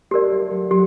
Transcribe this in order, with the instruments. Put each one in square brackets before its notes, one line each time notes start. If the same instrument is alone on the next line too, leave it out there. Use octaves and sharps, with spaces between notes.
[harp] A3 [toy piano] G4 A#4 D5
[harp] G3
F#3
[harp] F#3 [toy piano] G4